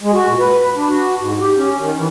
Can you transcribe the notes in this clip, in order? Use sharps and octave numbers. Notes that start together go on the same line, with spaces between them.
G#3
F#4
A#2
B4
B4
D4
F#4
G#2
G4
C#4
D#3
E3